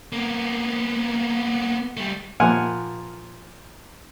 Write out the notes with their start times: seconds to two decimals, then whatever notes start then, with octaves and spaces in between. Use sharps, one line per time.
0.12 A#3 B3
1.97 G3 A3
2.40 A#2 F3 F#5 G#5 F6